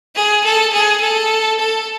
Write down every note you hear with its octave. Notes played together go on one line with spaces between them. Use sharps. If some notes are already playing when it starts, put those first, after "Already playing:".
G#4
A4
G#4
A4
A4